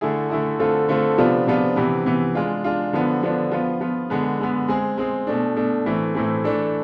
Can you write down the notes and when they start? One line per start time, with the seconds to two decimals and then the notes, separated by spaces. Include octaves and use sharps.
0.01 D3 A3 E4 G#4
0.30 D3 A3 E4 G#4
0.59 D3 A3 C4 F4 A4
0.89 D3 A3 C4 F4 A4
1.18 C3 F3 B3 D4 F4
1.47 C3 F3 B3 D4 F4
1.76 C3 E3 B3
2.06 C3 E3 B3
2.35 G#3 D4 F4
2.64 G#3 D4 F4
2.93 D3 F3 B3 D4
3.22 D3 F3 B3 D4
3.52 F3 B3 F4
3.81 F3 B3 F4
4.10 D3 G#3 B3
4.39 D3 G#3 B3
4.68 G#3 C4 G#4
4.97 G#3 C4 G#4
5.27 B2 A3 D4
5.56 B2 A3 D4
5.85 A2 E3 A3 C4
6.15 A2 E3 A3 C4
6.44 E3 A3 D4 A4